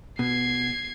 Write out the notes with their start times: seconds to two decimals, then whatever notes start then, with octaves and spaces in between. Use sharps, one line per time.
0.19 B2 G#6 C7